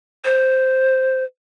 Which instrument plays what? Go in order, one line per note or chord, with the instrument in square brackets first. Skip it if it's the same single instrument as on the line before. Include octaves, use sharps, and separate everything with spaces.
[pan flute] C5